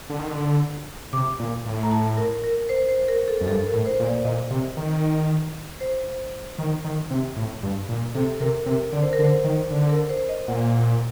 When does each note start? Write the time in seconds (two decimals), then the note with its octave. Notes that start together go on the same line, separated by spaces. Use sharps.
0.10 D3
0.19 D#3
0.30 D3
1.13 C3 D6
1.39 A#2
1.66 A2
1.83 A#5
1.92 A5
2.17 A#4
2.44 A#4
2.69 C5
2.88 C5
3.08 A#4
3.28 A4
3.41 F#2
3.48 G2 A4
3.66 A#4
3.73 A2
3.86 C5
3.99 A#2
4.06 D5
4.25 A#2 D#5
4.50 C3
4.77 D#3
5.80 C5
6.58 D#3
6.84 D#3
7.10 C3
7.37 A2
7.63 G2
7.89 A#2
8.15 C3 A4
8.40 C3 A#4
8.66 C3 A#4
8.92 D3 D5
9.02 C5
9.13 A#4
9.19 D3
9.23 C5
9.44 D#3
9.70 D3 D5
9.89 A#4
10.09 C5
10.29 D#5
10.48 A#2 F#5